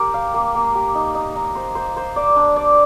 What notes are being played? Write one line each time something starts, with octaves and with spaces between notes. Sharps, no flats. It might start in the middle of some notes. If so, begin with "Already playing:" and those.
Already playing: G4 A#4
F5
A#3
A#3
G4
D#4
D#4
D#4
C5
C5
C5
D5
D4
D5